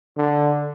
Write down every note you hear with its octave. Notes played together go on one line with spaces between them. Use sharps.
D3